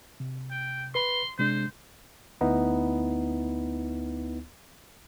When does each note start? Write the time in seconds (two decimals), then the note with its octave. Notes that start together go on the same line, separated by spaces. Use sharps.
0.20 C3
0.51 G5
0.95 B4 B5 C6
1.38 C3 G#3 D4 C5
2.41 D2 B3 D#4 E4